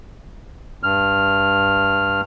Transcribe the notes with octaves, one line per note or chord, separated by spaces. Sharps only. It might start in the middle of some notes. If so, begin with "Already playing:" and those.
G2 F6